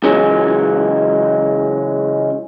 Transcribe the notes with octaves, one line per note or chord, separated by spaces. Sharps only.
C#3 E3 F#3 G#3